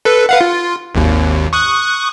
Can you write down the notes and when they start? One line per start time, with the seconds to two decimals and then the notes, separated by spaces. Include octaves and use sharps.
0.05 A4 B4
0.29 B4 F5 F#5
0.41 F4
0.94 G#1 D#2
1.53 C#6 D#6 F#6